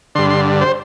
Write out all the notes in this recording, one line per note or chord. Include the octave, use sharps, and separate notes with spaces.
G2 D3 C6
C6
C5